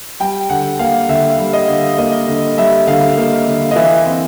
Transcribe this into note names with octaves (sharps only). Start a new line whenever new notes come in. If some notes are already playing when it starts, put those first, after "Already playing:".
G3 G5
D3 F#5
A#3 F5
D3 E5
G3
D#5
D3
A#3 D#5
D3
G3 E5
D3 F5
A#3
D3
D#5
E3 E5
C4